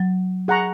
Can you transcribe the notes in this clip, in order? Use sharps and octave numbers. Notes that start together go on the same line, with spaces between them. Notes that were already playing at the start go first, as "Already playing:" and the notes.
Already playing: F#3
G#4 F#5 A#5 C#6